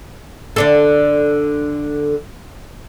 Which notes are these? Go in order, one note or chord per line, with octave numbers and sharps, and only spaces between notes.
D3 D4 A4